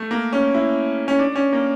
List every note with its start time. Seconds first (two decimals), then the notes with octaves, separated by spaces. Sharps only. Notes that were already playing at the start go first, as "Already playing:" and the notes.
Already playing: A3
0.11 A#3
0.33 C#4
0.55 E4
1.08 C#4
1.19 D4
1.36 C#4
1.53 A#3